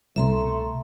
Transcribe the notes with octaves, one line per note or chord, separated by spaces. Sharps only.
C2 B2 A3 E5 A#5 C6